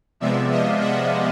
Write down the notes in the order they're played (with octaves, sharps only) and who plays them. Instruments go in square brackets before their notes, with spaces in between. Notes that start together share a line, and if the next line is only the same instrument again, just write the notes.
[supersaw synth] C3 F3 G#3 B3 D5 E5
D#5 F5
E5 F#5